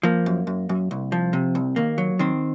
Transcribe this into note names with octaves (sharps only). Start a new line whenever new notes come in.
F3 A#3
F#2
F#2
F#2
C2
F3
C3
C2
D#2 A#3
F#3
D#3 C4